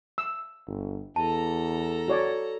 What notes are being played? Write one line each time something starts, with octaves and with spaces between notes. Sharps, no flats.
E6
G1
E2 A4 A5 A#5
F#4 C#5 D5